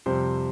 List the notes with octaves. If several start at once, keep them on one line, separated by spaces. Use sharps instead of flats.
F2 C3 G3 C4 C5